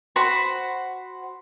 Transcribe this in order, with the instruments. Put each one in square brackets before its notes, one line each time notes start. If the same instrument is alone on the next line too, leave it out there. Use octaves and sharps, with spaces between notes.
[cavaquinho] F#4 C5 F#5 B5